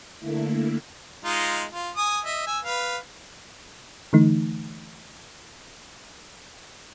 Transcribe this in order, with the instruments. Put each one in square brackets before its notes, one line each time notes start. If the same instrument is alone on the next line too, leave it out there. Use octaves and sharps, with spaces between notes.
[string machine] D3 A3 A#3 E4
[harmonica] G#3 D#4 F4
F4
G#5 D#6
D#5 E5
G#5 E6
B4 F5
[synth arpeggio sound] D3 E3 A3 D#4